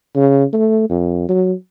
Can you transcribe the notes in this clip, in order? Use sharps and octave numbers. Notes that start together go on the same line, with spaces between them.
C#3
A3
F2
F#3